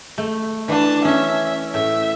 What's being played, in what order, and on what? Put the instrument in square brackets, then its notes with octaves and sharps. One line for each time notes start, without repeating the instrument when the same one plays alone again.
[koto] A3
[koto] E3 [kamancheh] D4 A5
[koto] C#4 [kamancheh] E5
[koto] A2 [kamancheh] E5